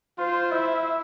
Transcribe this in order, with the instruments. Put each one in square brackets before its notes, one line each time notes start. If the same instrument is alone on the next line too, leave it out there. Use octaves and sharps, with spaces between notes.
[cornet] F4 [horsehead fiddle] C5
[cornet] E4 [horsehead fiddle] E5